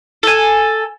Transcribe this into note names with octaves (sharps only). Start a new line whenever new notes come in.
A4 G#5